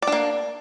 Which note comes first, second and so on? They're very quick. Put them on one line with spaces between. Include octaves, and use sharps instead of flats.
D5 D4 A#3